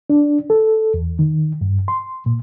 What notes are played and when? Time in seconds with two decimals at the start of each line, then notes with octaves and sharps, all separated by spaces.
0.10 D4
0.50 A4
0.94 E2
1.19 D#3
1.61 G2
1.88 C6
2.26 A#2